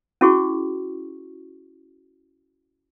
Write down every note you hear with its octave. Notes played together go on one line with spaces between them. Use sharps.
C#4 E4 F#4 G#4 C#6